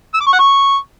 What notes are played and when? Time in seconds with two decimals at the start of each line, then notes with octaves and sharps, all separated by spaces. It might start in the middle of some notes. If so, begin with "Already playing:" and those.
0.14 E6
0.21 D6
0.27 C#6
0.33 F#5
0.39 C#6